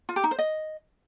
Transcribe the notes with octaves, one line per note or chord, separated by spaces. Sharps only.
F4
G4
D#4
C5
D#5